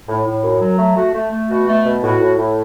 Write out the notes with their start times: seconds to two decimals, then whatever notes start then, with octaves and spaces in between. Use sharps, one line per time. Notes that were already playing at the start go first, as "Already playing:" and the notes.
0.08 A2
0.26 A2
0.44 F#2
0.61 F#3
0.79 A3
0.96 A3 F#4
1.14 A3
1.32 A3
1.49 B2 F#4
1.67 A3
1.85 B2
2.03 A2 F#4
2.20 A2
2.38 A2